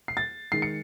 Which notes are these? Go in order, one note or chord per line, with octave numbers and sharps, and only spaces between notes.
C7
A6
D#3 G#3 C7
C#7